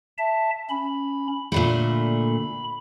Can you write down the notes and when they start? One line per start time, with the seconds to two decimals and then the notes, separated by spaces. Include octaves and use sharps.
0.18 E5 A5
0.70 C#4 B5
1.52 A#2 D3 A3 B5